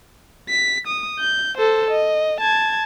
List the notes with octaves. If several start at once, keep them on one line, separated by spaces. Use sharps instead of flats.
B6
D#6
G6
A4 C5
D#5
A5 G#6